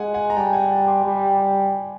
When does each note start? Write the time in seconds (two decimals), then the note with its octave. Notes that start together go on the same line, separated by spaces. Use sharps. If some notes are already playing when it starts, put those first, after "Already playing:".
Already playing: G#3 F#5 G#5
0.14 F#5 G#5
0.30 A#5
0.36 G3 G5 A5
0.53 F#5 G#5
0.71 G5 A5
0.87 C6 D6
1.05 G3